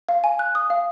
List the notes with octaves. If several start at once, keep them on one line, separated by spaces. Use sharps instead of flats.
F5
G#5
F#6
D#6
F5